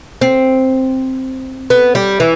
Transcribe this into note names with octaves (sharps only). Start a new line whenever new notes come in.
C4
B3
G3
E3